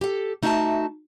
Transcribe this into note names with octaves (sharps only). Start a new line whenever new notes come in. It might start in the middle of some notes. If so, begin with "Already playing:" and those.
G4 A4
A3 D#4 F#4 E5 F5 A5